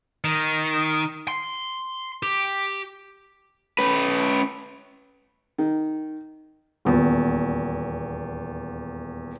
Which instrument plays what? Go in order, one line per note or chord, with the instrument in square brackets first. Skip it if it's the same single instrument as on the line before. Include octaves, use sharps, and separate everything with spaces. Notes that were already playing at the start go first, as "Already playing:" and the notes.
[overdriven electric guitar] D#3
C6
G4
[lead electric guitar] C#4 B4
[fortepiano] D#3
[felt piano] D#1 E2